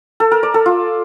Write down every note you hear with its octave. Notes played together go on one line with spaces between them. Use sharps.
A4
A#4
D5
A4
F4